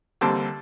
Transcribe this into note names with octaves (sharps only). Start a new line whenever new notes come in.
D#2 D3 G3 C4 A5